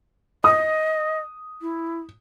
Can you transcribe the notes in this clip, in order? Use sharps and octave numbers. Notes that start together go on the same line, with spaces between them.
D#5 D#6
E4